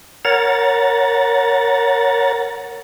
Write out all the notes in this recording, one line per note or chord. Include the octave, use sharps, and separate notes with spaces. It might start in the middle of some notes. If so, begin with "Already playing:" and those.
A#4 C#5 F#5 A#5 A6